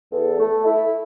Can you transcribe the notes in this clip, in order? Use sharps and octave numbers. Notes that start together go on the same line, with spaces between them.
E2 A4
A3
E4